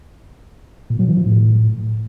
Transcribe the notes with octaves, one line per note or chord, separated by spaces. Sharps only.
A#2
F#3
E3
F3
A2